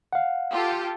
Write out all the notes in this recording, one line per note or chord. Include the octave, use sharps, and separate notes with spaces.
F5 F#5
F4 G4 A4